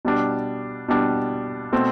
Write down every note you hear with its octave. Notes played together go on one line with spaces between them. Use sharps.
B2 G3 D4
B2 G3 D4
B2 A3 C4